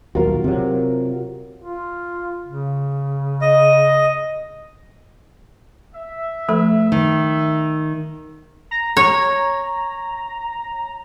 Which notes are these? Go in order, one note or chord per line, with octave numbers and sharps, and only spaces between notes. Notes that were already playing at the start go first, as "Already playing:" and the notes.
D#1 B1 F4 F#4 A#4
C3 F#3
F4
C#3
D#5
E5
F3 A3 A4
D#3
A#5
C#5